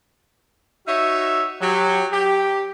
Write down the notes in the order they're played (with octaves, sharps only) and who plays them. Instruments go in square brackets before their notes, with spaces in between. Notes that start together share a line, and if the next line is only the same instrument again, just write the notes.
[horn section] D#4 F#4 C#5 E5
F#3 G4
G4